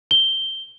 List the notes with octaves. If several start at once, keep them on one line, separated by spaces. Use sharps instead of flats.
G7